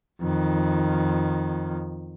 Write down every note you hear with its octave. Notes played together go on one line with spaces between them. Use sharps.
F2 D#3